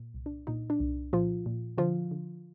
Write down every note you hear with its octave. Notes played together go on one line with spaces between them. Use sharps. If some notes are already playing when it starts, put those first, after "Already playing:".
Already playing: A#2
C2
D4
A#2 D#4
D4
C2
A#2 F3 F4
A#2
D3 F3 F4
D3